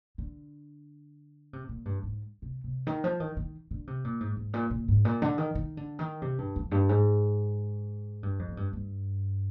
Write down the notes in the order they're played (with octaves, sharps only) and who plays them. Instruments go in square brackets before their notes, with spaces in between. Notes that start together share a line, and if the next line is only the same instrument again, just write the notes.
[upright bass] D3
C3
A#2
G2
G#2
C3
C3
D#3
F3
D#3
D#3
D3
C3
A#2
G#2
G#2
A#2
A#2
G#2
A#2
D3
D#3
D#3
D3
D#3
C3
G2
F2
G2
G#2
G2
F2
G#2
G2
G2